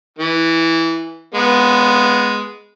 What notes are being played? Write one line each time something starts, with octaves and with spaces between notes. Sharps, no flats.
E3
G#3 B3